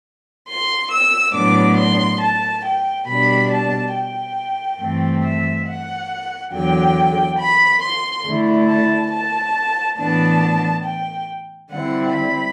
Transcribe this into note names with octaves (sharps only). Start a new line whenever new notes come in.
C6
E6
A2 F#3 B3 D4 D6
C6
A5
G5
B2 G3 D4 B5
A5
G5
G2 E3 A3 C4
E5
F#5
E2 D3 F#3 G5
B5
C6
D3 A3 E4
A5
A5
A2 E3 B3 D4 A5
G5
D3 G3 C4 E4 F#5
B5